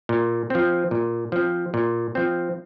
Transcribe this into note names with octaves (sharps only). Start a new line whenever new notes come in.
A#2
F3 C4
A#2
F3 C4
A#2
F3 C4